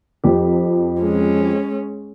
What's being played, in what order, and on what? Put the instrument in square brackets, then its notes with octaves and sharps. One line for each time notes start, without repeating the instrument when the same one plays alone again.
[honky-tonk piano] F2 F3 G4
[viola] G#3 C#4